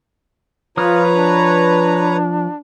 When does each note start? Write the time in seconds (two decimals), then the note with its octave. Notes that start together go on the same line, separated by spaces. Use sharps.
0.77 F3 F4 B4 C#5 A#5 D#6 F6
1.14 D4